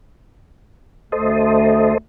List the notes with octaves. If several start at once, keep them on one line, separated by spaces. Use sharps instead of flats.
D2 A4 C5 D#5